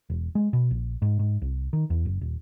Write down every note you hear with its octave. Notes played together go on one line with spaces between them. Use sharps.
E1
G#3
B2
A#1
G#2
G#2
C2
D#3
E2
F#1
D#1